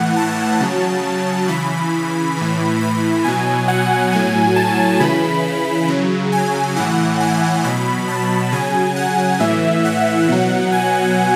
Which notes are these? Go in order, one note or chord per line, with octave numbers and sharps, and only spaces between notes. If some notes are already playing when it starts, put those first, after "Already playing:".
Already playing: A2 E3 F#5
A5
C#3 F#3
C#3 E3 B5
A2 E3
B5
B2 F#3 G#5
F#5
A2 F#3 G#5
A5
C#3 E3 B5
C#3 F#3
G#5
A2 E3 F#5
G#5
B2 F#3 B5
A5
C#3 F#3 G#5
F#5
A2 E3 E5
F#5
B2 F#3
G#5